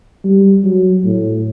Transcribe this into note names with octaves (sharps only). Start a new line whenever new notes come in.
G3
F#3
A2